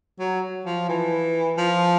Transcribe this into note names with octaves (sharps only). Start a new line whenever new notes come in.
F#3
F3
E3
F3